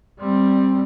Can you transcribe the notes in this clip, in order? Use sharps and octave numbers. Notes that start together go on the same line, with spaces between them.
G3 C4